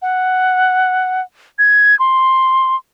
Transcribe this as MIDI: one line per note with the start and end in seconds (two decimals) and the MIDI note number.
0.02 1.21 78
1.59 1.98 92
1.99 2.76 84